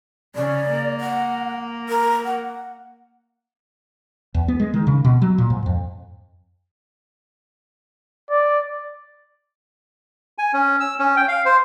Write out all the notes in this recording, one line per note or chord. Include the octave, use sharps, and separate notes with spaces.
C#3 C#4 D5
A#3
F#5
A#4
F#5
E2
B3
G#3
D#3
C#3
B2
F#3
A#2
G#2
F2
D5
G#5
C#4
E6
C#4
G5
F5
C5